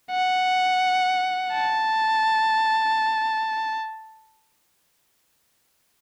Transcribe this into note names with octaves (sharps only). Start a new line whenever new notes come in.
F#5
A5